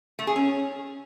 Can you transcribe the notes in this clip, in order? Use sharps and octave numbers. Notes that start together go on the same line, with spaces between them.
A3
G#4
C#4